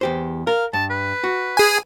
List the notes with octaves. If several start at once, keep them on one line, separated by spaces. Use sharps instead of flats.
E2 G4 C5
A#4 F5
G2 A5
B4
F#4
G#4 G#5